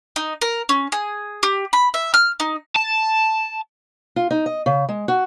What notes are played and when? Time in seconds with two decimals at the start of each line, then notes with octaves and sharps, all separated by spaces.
0.16 D#4
0.41 A#4
0.69 C#4
0.92 G#4
1.43 G4
1.73 B5
1.94 E5
2.14 F6
2.40 D#4
2.76 A5
4.16 F4
4.31 D#4
4.46 D#5
4.66 C#3
4.89 G#3
5.08 F#4